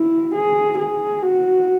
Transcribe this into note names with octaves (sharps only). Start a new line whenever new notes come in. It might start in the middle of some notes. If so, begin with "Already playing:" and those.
Already playing: E4
G#4
G#4
F#4